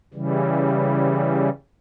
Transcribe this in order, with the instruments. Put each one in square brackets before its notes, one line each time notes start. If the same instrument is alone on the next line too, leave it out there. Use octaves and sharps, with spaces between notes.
[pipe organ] C#3 E3 G3